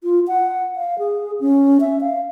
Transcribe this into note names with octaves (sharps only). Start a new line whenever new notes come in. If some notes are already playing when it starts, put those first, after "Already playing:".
F4
F#5
F5
G#4
C#4
E5
F5